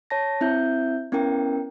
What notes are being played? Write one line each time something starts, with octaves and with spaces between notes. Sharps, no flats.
C#5 A5 A#6
C4 E4 E5 G6
B3 C#4 E4 A#4 G5